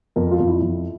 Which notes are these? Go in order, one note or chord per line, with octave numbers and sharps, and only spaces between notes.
F2 A#4
F4
F2
E4
F2